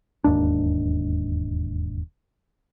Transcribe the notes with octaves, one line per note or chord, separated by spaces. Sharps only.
E1 D#2 G#2 D4